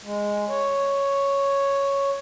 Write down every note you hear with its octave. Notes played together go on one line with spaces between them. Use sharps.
G#3
C#5